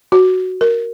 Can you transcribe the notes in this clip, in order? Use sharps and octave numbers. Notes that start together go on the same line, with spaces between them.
F#4
A#4